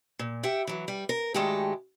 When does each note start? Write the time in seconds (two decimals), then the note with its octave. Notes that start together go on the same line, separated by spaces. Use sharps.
0.19 A#2
0.43 G4 E5 F#5 G5
0.67 E3 F#3
0.88 G3
1.09 A#4
1.34 G2 D#3 G#3 A3 F#4 G4